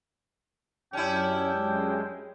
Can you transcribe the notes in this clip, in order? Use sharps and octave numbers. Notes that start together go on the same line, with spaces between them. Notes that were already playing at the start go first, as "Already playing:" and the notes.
F#2 C#4 D4 E4 G4 G5
F#2 G#3